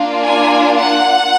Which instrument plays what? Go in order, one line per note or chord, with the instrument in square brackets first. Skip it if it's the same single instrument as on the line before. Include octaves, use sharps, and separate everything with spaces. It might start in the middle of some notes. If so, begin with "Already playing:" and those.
Already playing: [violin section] A#3 D4 F4
G#5
F#5